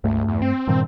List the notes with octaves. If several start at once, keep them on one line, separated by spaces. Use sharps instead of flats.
C#2 G2 A3
E2
C4
G2 A#2 D#3